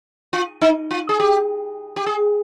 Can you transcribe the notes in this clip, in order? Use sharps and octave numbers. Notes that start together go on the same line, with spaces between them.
F4
D#4
F4
G#4
G4
G4
G#4